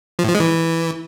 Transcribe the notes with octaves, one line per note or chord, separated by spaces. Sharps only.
F3
A2
F3
G#3
E3